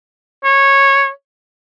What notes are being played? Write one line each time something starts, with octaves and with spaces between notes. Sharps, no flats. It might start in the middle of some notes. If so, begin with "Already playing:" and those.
C#5